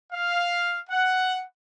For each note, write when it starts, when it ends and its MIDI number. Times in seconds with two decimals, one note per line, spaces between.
0.12 0.79 77
0.90 1.43 78